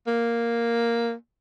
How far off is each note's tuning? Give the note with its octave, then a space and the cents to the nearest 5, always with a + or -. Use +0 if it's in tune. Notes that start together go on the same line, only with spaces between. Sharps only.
A#3 +0